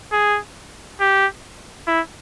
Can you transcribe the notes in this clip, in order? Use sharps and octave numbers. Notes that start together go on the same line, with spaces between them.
G#4
G4
E4